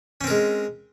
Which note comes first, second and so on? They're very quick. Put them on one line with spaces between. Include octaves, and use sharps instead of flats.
C#4 C4 A#4 G#3